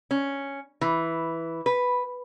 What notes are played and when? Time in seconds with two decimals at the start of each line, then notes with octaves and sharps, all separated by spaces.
0.11 C#4
0.81 E3
1.66 B4